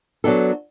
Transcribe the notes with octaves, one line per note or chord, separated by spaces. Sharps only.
F#3 B3 D4 A4